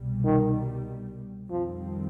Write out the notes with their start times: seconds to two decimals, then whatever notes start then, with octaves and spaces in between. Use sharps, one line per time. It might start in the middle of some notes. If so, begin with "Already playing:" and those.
Already playing: C2 B2 G3
0.25 D#3
1.50 F2 D#3 F3 G3 C4